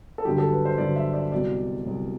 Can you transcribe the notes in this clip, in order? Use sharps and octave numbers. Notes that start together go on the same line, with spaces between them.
A4
G2 D3 F#3 G4
A4
B4
C5
G2 D3 F#3 D5
E5
D5
C2 B2 F#3 D5
C2 B2 F#3